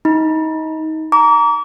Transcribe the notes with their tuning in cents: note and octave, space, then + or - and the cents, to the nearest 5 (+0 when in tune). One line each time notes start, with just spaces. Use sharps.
D#4 +25 B5 -40
A#5 +0 D6 -35